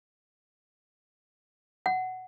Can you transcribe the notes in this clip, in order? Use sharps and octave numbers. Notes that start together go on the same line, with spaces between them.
F#5